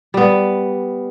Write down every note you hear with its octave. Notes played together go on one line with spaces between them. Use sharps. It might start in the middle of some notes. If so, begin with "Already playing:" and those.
G3 B3